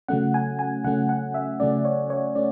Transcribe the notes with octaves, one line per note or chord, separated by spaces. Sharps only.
C#3 F#3 A3 C#4 F#5
G#5
G#5
C#3 F#3 A3 C#4 F#5
F#5
E5
C#3 F#3 A3 C#4 D5
C#5
C#5
A3 C#4 D5